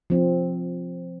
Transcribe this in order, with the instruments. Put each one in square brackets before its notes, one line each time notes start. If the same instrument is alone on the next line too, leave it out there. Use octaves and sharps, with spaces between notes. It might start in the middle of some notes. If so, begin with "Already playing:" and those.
[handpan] F3 C4